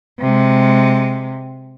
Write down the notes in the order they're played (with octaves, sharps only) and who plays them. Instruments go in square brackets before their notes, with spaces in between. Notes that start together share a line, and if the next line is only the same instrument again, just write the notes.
[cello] C3 G#3